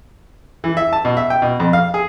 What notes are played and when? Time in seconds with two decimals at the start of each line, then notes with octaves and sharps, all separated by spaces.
0.64 E3
0.77 E5
0.93 A5
1.05 B2
1.17 E5
1.30 G5
1.42 B2
1.60 F2
1.73 F5
1.94 G#4